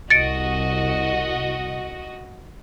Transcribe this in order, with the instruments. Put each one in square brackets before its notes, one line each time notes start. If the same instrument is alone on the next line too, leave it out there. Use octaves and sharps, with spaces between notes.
[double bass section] C2 [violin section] F#4 D#5 [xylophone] A6 C#7 D7